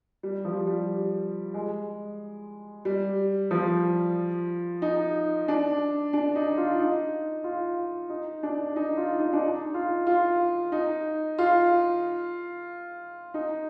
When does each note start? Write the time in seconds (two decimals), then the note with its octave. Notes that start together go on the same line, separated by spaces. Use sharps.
0.23 G3
0.45 F3
0.67 G3
1.54 G#3
2.85 G3
3.51 F3
4.82 D#4
5.48 D4
6.13 D4
6.35 D#4
6.57 F4
6.79 D#4
7.44 F4
8.09 D#4
8.43 D4
8.76 D#4
8.97 F4
9.20 D#4
9.33 D4
9.42 D#4
9.74 F4
10.07 F4
10.72 D#4
11.38 F4
13.34 D#4